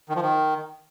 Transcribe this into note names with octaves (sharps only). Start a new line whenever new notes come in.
D#3
F3
D#3